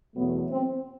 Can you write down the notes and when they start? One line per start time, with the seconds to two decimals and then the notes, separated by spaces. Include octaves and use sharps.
0.14 E2 B2 F#3 A3 B3
0.50 C4